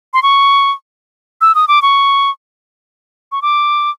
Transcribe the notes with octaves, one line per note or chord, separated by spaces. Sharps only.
C6
C#6
E6
D#6
D6
C#6
C#6
D6